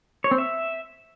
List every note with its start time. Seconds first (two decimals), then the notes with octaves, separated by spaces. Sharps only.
0.24 C#5
0.31 C4
0.38 E5